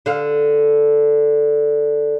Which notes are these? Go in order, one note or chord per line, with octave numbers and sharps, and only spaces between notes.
D3 F5